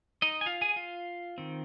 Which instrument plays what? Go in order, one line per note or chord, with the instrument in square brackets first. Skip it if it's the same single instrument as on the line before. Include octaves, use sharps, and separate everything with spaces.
[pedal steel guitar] D#4 D#5
G#5
F4 F5
G#4 G#5
F4 F5
D#3 C4